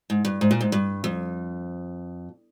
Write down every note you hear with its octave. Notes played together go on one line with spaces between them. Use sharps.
G#2
G2
G#2
A#2
G#2
G2
F2